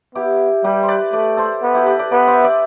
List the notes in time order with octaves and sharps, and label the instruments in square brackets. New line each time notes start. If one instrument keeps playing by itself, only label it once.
[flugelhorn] B3 [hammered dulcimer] E4 G4
[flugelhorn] G3 [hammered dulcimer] G4 B4
[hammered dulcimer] C5
B4 D5
[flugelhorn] A3 [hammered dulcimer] B4 D5
[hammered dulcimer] A4 C5
[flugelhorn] B3
[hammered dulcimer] E4 G4
G4 B4
B4 D5
[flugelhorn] B3 [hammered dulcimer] B4 D5
[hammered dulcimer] C5 E5
B4 D5